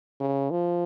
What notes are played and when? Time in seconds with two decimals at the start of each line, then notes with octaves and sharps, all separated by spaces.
0.20 C#3
0.51 F3